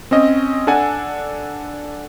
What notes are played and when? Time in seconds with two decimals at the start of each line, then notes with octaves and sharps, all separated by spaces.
0.11 C4 C#4 D#5
0.67 D4 A4 F#5 G#5